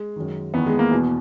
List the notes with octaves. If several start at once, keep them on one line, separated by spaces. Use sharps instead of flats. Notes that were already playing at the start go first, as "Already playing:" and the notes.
Already playing: G#3
F#2 D#3
E2 D#3 B3
G#3
A#3
E2 B2